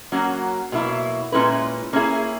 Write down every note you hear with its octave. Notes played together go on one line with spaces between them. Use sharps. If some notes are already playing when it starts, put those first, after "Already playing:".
F#3 A#3 C#4 F#4
B2 F#3 A#3 E4
A#2 G#3 C#4 E4 B4
A#3 C#4 E4 G#4